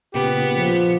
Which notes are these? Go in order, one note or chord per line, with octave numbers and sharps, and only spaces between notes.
A#2 C#3 B3 G4
F3